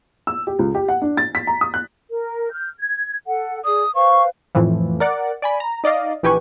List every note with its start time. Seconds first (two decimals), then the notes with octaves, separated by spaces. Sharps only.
0.27 E6
0.47 G4
0.59 C#2
0.75 G4
0.88 F#5
1.02 D4
1.17 A6
1.35 B6
1.47 A#5
1.61 D#6
1.74 F#6
2.10 A#4
2.51 F6 G6
2.79 G#6
3.26 A4 F#5
3.65 G#4 D5 D#6
3.95 B4 C5 F5 C#6
4.55 F2 A2 E3 F3
5.00 A#4 D5 F#5
5.42 D5 G#5 B5
5.60 A#5
5.84 D#4 D5 D#5 F5
6.23 A#1 E3 G4 B4 G#5 C#6